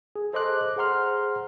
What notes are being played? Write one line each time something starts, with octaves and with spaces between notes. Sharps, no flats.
G#4
A4 C5 D#5 C6 D6 F#6
G#4 C5 F#5 A#5 C6 F6